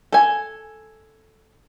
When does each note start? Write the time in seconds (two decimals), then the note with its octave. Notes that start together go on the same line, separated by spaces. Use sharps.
0.12 A4 G#5